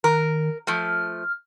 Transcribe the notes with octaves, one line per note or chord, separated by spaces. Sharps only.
D#3 A#4
F3 A3 F6